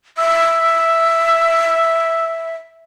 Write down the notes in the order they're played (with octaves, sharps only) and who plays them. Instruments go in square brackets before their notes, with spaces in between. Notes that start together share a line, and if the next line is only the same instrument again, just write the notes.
[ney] E5 [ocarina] E6